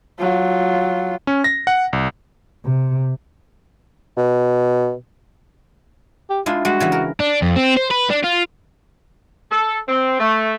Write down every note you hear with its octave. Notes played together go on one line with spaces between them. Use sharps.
F#3 F4
C#4
A#6
F#5
C2
C3
B2
G4
G#3 D4 E4 F4
G3 G#3 F#4
C#3 E3 B3
A#4
D4
F2
C4
C5
B4
D4
F4
A4
C4
A3